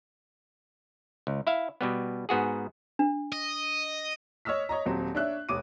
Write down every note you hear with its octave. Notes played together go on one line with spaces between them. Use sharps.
C#2
E4 E5 F5
B2 G3 B3
G#2 B3 F#4 G#4
D4
D#5
C#5 D#5 E6 F6 B6
C#5 D#5 A#5
D#1 F#3 C4
D4 C#5 E5 F#6
F1 C#5 D6 D#6 D#7